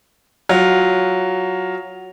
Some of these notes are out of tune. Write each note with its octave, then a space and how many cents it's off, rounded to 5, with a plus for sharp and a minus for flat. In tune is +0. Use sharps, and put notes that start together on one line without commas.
F#3 +5 F4 +10